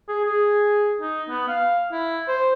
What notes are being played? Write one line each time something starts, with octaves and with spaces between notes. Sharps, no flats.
G#4
G#4
D#4
B3
F5
E4
C5